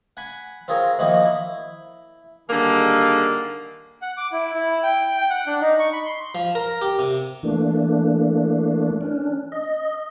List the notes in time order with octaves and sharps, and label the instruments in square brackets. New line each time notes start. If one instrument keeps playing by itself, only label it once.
[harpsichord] F#5 G#5 B5
C4 F4 G#4 A#4 C#5
D#3 F3 A#3 D#4 E4 F#4
E4
[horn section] D3 D#3 G3 A#3 G#4
[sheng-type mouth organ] F#5
D6
E4
E4
G5
G5
F#5
D4
D#4
C#6
B5
C6
[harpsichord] F3
A#4
G4
C3
[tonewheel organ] E3 A3 A#3 D4
C#4 D4
D#5